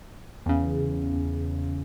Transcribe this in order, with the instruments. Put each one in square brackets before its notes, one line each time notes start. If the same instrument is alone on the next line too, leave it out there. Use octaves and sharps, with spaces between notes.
[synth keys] E2 C#3